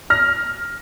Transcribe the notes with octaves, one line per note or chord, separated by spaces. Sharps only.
F6 A#6